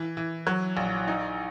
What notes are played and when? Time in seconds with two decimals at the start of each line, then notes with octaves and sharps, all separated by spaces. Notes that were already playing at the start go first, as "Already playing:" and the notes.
Already playing: E3
0.17 E3
0.47 F#3
0.77 A#1
1.07 D#4